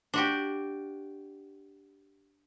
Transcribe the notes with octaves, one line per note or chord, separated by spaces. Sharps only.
D4 F#4 G4